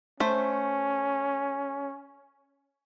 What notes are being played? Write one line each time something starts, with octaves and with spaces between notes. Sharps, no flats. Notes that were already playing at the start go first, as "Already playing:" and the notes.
A3 C#4 C5